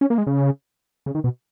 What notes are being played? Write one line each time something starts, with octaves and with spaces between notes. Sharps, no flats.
C#4
A#3
G#3
C#3
C#3
D#3
B2